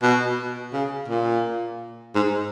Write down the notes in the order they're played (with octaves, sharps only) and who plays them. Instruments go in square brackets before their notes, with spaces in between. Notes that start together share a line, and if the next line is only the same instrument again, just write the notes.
[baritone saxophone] B2
C#3
A#2
G#2